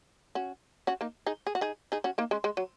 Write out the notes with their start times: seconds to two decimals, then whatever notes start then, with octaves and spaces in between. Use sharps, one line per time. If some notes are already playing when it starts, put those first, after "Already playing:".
0.35 C#4 F#4
0.87 C#4 F#4
1.01 A#3 D#4
1.27 D#4 G#4
1.47 G#4
1.55 F#4
1.61 D#4 G#4
1.92 D#4 G#4
2.04 C#4 F#4
2.18 A#3 D#4
2.31 G#3 C#4
2.44 G#3
2.57 F#3